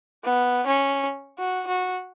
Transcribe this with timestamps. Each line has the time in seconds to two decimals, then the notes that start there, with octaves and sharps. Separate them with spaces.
0.25 B3
0.67 C#4
1.39 F#4
1.67 F#4